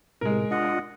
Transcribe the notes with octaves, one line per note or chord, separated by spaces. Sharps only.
A2 C3 G#3 A#4
D4 F4 D#5 F#5